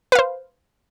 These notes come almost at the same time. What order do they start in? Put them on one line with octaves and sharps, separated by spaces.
B4 F5 C5